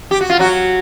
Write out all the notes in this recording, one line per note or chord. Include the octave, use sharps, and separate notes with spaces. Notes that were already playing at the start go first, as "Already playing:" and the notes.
G4
F#4
F4
F#3 F#4